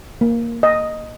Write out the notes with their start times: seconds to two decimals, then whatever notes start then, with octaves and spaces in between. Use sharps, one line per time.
0.21 A#3
0.63 D#5